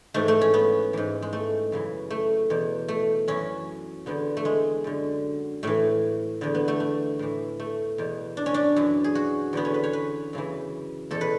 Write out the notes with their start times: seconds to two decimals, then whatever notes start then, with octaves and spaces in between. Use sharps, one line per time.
0.14 G#2 E3 A3
0.28 A3
0.41 C#4
0.54 B3
0.93 G#2 E3
1.22 G#3
1.33 A3
1.72 F#2 C#3 E3
2.10 A3
2.50 E2 B2
2.88 A3
3.28 F#2 E3 C#4
4.06 E2 D3 B3
4.37 A3
4.45 G#3
4.84 F#2 D3
5.63 A2 E3 A3
6.41 E2 D3 B3
6.55 B3
6.68 A3
6.80 A3
7.19 A2 E3
7.60 A3
7.98 E2 B2
8.37 D4
8.46 C#4
8.54 D4
8.76 F#2 E3
9.04 G#4
9.15 F#4
9.53 E2 D3 B3
9.65 C#4
9.74 B4
9.84 C#5
9.93 B4
10.33 F#2 C#3 E3
11.11 E2 B2 A4
11.21 B4